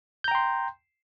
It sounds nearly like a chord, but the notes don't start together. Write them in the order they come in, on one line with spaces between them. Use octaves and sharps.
G6 A#5 G5 C6